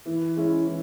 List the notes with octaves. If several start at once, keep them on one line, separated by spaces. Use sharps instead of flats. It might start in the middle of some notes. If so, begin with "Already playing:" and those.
E3
G#3 C#4 E4
E3